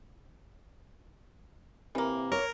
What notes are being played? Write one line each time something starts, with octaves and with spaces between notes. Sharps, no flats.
C3 E3 A#3
A#4 C#5